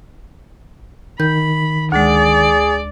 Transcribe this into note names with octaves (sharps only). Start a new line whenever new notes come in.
D#3 B5 G6
D2 G#3 G#4 D5